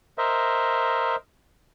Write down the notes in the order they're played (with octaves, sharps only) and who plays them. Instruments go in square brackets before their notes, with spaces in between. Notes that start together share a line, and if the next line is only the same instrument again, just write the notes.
[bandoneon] A#4 C5 D#5 E5